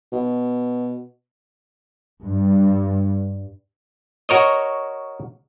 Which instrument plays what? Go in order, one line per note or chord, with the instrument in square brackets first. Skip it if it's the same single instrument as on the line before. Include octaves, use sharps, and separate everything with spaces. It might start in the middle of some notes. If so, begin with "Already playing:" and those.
[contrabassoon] B2
[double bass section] G2
[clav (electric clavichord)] F#4 A#4 C#5 D#5